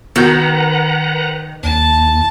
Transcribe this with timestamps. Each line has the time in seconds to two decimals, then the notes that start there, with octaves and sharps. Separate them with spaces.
0.16 D#3 B3 F#4 B4 F#5 A#5 G6
1.63 D#2 A5